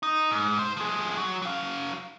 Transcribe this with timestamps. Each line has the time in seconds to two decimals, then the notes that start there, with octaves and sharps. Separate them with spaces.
0.03 D#4
0.31 G#2
0.59 G#3 C5
0.77 F3 G#4
1.17 F#3
1.42 F#3 F5